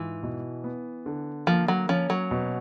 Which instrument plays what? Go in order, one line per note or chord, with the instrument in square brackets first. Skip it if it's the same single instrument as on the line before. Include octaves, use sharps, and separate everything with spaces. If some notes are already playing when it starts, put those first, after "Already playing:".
Already playing: [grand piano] G#2 F4 [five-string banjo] E3
[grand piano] B2
B3
D3
[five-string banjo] F3 [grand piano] A#3
[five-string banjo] F#3
[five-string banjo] F3 [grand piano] C#4
[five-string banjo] F#3
[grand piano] B2